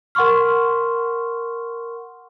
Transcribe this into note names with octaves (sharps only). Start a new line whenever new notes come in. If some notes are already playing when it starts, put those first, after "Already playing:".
A#4 F#5 C6 C#6 F6